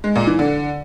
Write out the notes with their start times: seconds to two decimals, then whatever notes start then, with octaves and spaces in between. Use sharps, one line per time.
0.04 G#3
0.15 A#2
0.27 E3
0.39 D3